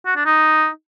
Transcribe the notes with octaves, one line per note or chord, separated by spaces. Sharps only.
F#4
D4
D#4